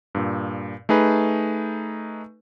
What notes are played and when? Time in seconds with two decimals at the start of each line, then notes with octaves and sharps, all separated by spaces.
0.15 G2 A#2
0.89 A3 D#4 G#4 B4